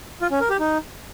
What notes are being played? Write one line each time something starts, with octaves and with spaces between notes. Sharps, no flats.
F4
C#4
A#4
G4
D#4